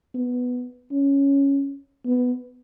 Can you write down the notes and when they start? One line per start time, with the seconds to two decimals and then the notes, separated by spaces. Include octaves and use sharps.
0.14 B3
0.91 C#4
2.05 B3